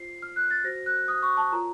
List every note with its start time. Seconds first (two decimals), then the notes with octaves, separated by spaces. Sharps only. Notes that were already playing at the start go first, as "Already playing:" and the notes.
Already playing: F4 C5 C7
0.22 F6
0.36 F#6
0.51 A6
0.64 F#4 C5 A#6
0.86 F#6
1.08 D#6
1.23 C#6
1.37 A5
1.52 F4 A#4 C#5 A#5